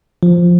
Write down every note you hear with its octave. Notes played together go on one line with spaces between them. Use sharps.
F3